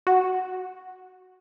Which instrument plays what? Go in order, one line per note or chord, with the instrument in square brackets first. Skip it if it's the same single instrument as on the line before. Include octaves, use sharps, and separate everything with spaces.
[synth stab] F#4